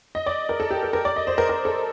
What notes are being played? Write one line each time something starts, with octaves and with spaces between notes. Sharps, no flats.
D#5
D5
A#4
A4
G4
A#4
A#4
D5
D#5
C5
A#4
A#4
A4